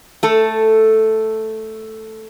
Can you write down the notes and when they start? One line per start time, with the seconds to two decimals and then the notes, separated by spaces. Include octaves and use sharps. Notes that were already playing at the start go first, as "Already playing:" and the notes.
0.23 A3 A4